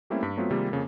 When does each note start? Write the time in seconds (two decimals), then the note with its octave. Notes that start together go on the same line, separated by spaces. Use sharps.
0.10 G3 A3 A#3 C4 C#4 E4
0.23 G2 B6
0.37 F#3 A3 B3 C4 F4 F#4
0.51 C3 D#3 G3 G#3 A#3 F4
0.71 F2 C#3 A#3